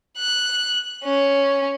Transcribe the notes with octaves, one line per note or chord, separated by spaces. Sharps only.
F#6
C#4